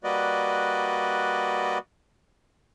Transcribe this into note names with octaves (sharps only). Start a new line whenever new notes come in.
G3 A#3 F#4 B4 D5 D#5